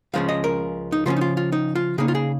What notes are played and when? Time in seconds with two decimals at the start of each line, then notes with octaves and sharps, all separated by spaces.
0.13 C#2 C#3 F3 G#3 C#4 F5
0.29 D#5
0.44 A#4
0.92 D#4
1.06 C#3 F3 A#3 C#4 F4
1.17 D#4
1.21 F4
1.37 F4
1.52 D#4
1.75 F4
1.98 C#3 A#3 D#4 G#4
2.08 F4
2.15 G#4